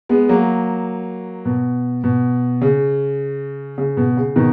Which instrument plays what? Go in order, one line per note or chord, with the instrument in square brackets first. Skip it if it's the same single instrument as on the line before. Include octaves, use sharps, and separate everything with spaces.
[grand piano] G#3 B3
F#3 A#3
B2
B2
C#3
C#3
B2
C#3
B2 D#3